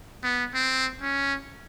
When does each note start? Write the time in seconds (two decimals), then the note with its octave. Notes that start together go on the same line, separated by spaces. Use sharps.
0.23 B3
0.54 C4
1.01 C#4